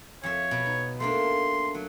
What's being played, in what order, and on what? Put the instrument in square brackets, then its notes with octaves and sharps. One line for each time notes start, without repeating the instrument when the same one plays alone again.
[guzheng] F2 E5 [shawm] C#5
[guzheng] B2
D#4
[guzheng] A3 A#3 D4 [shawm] C6
[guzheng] F#3